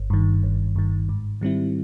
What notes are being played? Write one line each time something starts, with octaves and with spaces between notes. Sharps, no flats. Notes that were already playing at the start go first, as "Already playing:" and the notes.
Already playing: G1
G2 D#3
G1
G2 D#3
G#2
D#3 G3 C4 E4